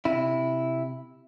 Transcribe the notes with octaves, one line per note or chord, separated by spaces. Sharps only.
C3 E4